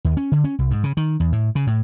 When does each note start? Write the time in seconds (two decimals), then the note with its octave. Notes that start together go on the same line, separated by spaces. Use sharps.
0.05 D#2
0.17 C#4
0.32 D3
0.44 C#4
0.59 C2
0.71 G#2
0.84 C#3
0.97 D#3
1.20 E2
1.32 A2
1.55 C#3
1.67 A2